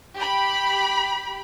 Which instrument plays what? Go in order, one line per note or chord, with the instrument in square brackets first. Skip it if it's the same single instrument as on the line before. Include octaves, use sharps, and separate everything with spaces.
[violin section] G4 B5